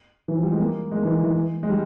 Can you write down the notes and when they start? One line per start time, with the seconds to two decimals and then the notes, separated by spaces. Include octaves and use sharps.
0.28 E3
0.36 F3
0.43 G3
0.52 G#3
0.59 A#3
0.91 G#3
0.96 A#3
1.05 E3
1.24 E3
1.63 G#3
1.70 G3